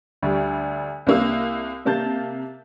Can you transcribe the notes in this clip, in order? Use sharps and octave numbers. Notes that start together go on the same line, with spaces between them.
D2 D3 G3
C2 A#3 E6
C3 A#3 A5 G6 A6